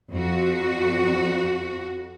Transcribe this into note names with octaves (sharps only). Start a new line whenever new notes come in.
F2 F#4